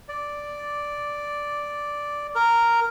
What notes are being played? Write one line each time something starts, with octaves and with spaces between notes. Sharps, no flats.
D5
A#4